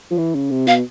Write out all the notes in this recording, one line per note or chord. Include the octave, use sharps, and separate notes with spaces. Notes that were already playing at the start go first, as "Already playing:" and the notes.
F3
E3
C#3
C3
B2 F5